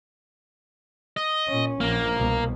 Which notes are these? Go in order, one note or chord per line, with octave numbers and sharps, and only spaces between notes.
D#5
A#2 C#4
A#1 A#3
C2 B2